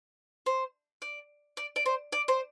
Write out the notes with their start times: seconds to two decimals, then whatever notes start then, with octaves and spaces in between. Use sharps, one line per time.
0.46 C5
1.02 D5
1.57 D5
1.76 D5
1.86 C5
2.12 D5
2.28 C5